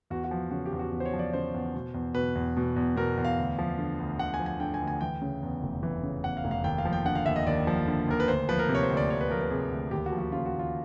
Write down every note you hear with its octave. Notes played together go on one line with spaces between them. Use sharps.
E2 F#4
F#4
F3
C#3 F#4
G4
E2
F#4
E2
C5
C#5
F3
D5
C#3 C5
E2
B2
E2
B2 B4
E2
B2
E2
B2 A#4
E2
F5
D2
F3
D3
D2
D2 F#5
G#5
F3
G#5
D3 G5
G#5
D2
G#5
E3 G5
C#3
E2
F1
E3
C#3
E2 F#5
F5
F1
F5
D#2 G5
F5
F3
G5
D3 F#5
F5
D#2 E5
D#5
D#2 D5
F3
D3
D#2 A#4
B4
D2 C5
F3 B4
A#4
C3
C#5
C5
D2
D5
D2 C#5
B4
F3 A#4
B4
C3 G#4
D2
D#2 G4
F#4
F3
F#4
C#3 F4
F#4
D#2
F4